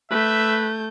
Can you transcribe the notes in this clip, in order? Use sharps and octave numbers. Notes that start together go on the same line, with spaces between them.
A3 B4 E5 G6